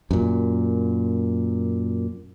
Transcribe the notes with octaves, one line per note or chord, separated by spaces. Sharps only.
F#2 A#2